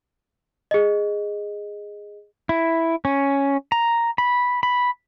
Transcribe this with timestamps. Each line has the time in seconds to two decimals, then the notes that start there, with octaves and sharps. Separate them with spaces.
0.71 G#4 D#5
2.49 E4
3.05 C#4
3.72 A#5
4.18 B5
4.63 B5